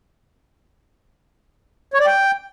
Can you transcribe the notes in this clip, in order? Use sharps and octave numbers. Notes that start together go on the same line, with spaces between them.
C#5
D5
G5